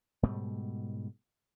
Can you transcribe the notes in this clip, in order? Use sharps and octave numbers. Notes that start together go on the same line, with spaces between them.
G#2 B2 G3 A3